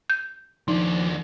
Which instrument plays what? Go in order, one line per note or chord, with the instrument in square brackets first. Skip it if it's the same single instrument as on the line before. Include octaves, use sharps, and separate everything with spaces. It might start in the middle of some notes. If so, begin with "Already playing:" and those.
[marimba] G6
[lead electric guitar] D#2 D4 [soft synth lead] F3 [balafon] D#4